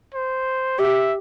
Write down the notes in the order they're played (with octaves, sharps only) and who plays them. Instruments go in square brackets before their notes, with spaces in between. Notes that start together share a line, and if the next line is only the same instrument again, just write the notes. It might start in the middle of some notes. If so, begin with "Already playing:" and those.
[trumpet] C5
[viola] G4 [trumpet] E5